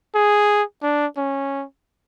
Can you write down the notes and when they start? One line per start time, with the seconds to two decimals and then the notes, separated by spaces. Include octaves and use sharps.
0.15 G#4
0.83 D4
1.17 C#4